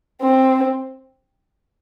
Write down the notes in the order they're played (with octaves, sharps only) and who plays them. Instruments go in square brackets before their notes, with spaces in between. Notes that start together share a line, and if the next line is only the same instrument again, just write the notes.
[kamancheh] C4